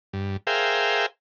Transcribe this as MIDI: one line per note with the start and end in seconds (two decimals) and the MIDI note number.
0.13 0.37 43
0.47 1.06 68
0.47 1.06 70
0.47 1.06 72
0.47 1.06 76
0.47 1.06 77
0.47 1.06 79